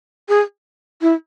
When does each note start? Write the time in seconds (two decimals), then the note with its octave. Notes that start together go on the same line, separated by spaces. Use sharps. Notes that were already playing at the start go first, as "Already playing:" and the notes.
0.29 G#4
1.02 E4